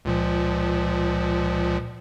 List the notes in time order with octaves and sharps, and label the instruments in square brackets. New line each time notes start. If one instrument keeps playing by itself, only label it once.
[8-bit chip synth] C#2 A#2 F3